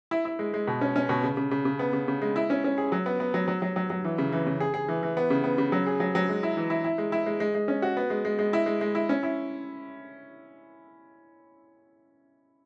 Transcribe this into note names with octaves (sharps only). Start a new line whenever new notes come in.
E4
E4
G#3
G#3
B2
C#4
C#4
B2
C#3
C#3
C#3
C#3
B3
C#3
C#3
G#3
E4
C#4
C#4
G#4
F#3
B3
B3
F#3
F#3
F#3
F#3
F#3
E3
C#3
E3
C#3
G#4
G#4
E3
E3
B3
C#3
B3
C#3
F#3
G#4
F#3
F#3
G#3
E4
E3
E4
E4
G#3
E4
G#3
G#3
G#3
C#4
F#4
B3
G#3
G#3
G#3
E4
G#3
G#3
E4
C#4
E4